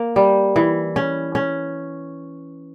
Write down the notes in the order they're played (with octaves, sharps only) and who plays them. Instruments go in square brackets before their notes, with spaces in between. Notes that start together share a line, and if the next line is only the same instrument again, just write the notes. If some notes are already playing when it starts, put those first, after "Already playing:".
Already playing: [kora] A#3
G3
E3
C#4
C#4